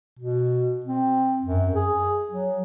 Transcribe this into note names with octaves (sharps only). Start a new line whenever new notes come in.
B2
C4
F#2
G#4
F#3